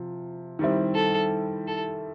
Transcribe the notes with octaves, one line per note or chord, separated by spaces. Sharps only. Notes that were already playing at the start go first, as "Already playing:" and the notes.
Already playing: C3 F3
D#3 G3 C4 E4
A4
A4